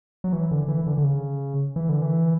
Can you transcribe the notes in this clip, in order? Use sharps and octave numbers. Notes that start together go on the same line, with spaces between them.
F#3
E3
D3
E3
D3
D3
C#3
E3
D3
E3